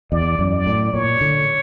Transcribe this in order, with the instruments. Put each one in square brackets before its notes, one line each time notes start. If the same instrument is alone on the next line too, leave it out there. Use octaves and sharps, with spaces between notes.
[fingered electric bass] E2 [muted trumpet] D5
[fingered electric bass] F#2
[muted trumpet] D5
[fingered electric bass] A2
[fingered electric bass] A#2 [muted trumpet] C#5
[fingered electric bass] D3